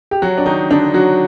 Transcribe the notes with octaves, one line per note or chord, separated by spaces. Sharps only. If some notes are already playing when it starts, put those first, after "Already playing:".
G4
F#3 F#4
D4
D#3 D#4
D3 D4
F#3 F#4